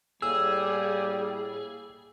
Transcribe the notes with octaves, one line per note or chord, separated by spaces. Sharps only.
A2 G3 A#3 G#4 E6